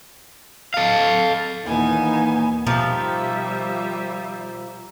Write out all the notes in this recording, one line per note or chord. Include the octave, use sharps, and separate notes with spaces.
A4 F5
D#2 A#2 E3 B3 D#4 G#5
B2 D#3 F3 G3 E5 A#5 D6 C#7